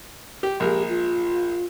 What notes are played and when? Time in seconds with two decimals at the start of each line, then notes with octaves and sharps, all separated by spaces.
0.43 G4
0.60 A#1 G#3 G4 A#4
0.89 F4